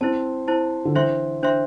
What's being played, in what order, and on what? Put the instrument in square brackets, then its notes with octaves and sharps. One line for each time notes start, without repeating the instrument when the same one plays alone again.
[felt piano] C4 [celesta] E4 C5 A5
[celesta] E4 C5 A5
[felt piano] D3
[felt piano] E3 [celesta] D4 C5 E5 C6
[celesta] D4 C5 E5 C6